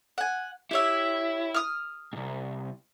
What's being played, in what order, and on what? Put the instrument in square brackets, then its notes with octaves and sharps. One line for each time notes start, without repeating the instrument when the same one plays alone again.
[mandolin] F#5 G#5
[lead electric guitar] E4 [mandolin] G4 C#5 E5
[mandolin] D#6 F6
[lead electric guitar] C2 G#2